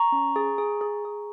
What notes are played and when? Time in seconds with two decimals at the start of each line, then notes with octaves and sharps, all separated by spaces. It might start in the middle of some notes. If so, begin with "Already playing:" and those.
Already playing: A#5 C#6
0.12 C#4
0.36 G#4
0.58 G#4
0.81 G#4
1.05 G#4